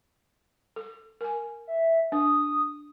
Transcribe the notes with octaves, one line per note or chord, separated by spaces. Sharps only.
A4
A#4 G#5
E5
D4 D#6